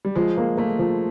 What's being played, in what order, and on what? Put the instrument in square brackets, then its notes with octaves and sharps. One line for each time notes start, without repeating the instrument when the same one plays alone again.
[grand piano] G3
[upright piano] F3 [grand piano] G#3
[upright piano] A#3
[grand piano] A3 [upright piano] A#3
[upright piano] F3